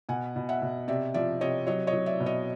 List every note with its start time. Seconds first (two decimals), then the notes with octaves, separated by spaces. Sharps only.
0.09 B2 F#5 G#5
0.36 B2
0.49 E5 F#5
0.62 B2
0.88 C3 D5 E5
1.14 F3 D5 E5
1.41 C3 C#5 D#5
1.67 F#3 C#5 D#5
1.87 C#5 D#5
1.93 F#3
2.06 D5 E5
2.20 B2
2.26 C#5 D#5